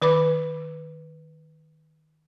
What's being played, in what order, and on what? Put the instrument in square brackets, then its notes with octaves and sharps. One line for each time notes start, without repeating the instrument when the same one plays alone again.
[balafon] D#3 B4 B5 D6